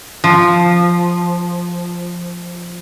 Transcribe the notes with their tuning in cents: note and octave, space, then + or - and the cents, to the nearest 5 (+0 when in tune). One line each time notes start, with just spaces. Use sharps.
F3 +0